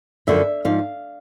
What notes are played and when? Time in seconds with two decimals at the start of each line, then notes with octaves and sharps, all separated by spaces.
0.27 F#2 D3 F3 E5
0.65 G#2 F3 F5